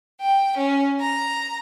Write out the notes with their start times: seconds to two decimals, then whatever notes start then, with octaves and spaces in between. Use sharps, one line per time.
0.20 G5
0.57 C#4
1.00 A#5